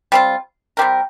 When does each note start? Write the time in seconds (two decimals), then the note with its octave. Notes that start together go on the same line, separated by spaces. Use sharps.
0.12 G3 C4 F4
0.77 G3 C4 G4 A#4